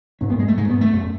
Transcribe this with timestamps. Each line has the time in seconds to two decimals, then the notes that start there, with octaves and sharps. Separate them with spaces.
0.21 G#2 C#4
0.30 B3
0.39 G#3
0.48 A3
0.57 G#2 G#3
0.69 B3
0.81 A3
0.93 F#2